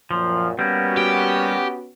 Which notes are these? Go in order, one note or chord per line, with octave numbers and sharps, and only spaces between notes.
F#2 A#2 F3
G3 A#3 B3 C#4 F#4
G4